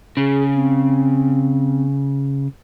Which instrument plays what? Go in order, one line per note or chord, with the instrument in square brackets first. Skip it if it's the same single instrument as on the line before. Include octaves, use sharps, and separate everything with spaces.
[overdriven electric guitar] C#3 [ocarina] G#4
[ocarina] C4